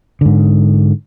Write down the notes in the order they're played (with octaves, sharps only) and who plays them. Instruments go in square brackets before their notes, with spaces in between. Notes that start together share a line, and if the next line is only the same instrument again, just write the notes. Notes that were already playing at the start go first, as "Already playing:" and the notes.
[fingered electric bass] G#2 D3